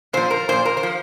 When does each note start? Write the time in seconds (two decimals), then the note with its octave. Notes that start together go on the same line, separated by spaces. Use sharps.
0.13 A#2 F3 C5
0.31 A#4
0.49 A#2 F3 C5
0.65 A#4
0.77 C5
0.83 F3